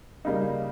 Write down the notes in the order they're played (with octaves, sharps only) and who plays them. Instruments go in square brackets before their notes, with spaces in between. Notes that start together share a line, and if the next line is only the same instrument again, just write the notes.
[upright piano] C#3 G3 A#3 D#4